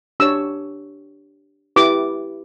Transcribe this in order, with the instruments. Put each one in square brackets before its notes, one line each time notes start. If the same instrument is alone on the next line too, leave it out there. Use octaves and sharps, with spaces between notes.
[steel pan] D4 G4 C#5 E6
E4 G4 B4 D6